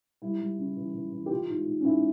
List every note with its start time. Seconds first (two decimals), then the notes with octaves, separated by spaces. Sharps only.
0.22 G3 E4
0.41 G3
0.59 C#3
0.77 E3
0.94 E3
1.12 E3
1.26 G4
1.31 E3 F4
1.49 G#2
1.67 G#2
1.80 C#4
1.85 G#2 E4